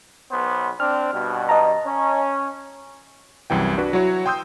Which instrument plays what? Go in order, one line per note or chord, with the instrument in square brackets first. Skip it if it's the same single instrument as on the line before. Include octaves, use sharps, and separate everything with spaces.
[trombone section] B1 B3 C5
[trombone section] C4 D4 [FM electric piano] F6
[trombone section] G2 B2
[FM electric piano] D#5 A5 A#5
[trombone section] C#4
[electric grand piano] C2 F#2 E3 G5
D4 F#4 B4
F#3 E4 F#4 C#5
G5 C6 D#6 E6 G6